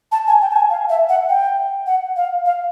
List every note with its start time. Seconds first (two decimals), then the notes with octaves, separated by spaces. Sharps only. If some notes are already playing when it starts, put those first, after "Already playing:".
0.11 A5
0.27 G#5
0.41 G5
0.50 A5
0.55 G#5
0.70 F5
0.89 E5
1.09 F#5
1.28 G5
1.86 F#5
2.16 F5
2.45 F5